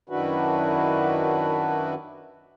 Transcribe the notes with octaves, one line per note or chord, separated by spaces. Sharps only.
F#2 D#3 D4 E4 F#4 B4